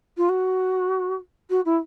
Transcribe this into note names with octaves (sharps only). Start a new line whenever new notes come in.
F4
F#4
F#4
E4